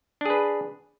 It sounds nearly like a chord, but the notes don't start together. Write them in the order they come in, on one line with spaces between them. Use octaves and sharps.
D4 G#4 B4